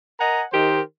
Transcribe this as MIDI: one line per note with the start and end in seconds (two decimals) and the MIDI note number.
0.20 0.43 70
0.20 0.43 75
0.20 0.43 78
0.20 0.43 80
0.20 0.43 82
0.53 0.80 51
0.53 0.80 63
0.53 0.80 67
0.53 0.80 70
0.53 0.80 72